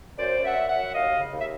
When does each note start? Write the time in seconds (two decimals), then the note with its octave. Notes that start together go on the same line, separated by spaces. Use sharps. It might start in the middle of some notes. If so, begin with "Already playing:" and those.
0.18 F#2 C5 D5
0.37 F#2
0.43 E5 F#5
0.57 F#2
0.68 E5 F#5
0.74 F#2
0.94 D#2 D#5 F5
1.12 C#3
1.32 D#2
1.39 E5